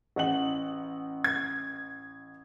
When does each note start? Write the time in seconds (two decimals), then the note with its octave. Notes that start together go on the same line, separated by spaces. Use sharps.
0.16 A1 F#5 F#7
1.24 G#6